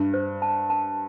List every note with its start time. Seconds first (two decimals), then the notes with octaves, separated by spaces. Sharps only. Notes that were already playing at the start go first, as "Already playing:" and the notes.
Already playing: G2 E5
0.14 C5
0.42 A5
0.70 A5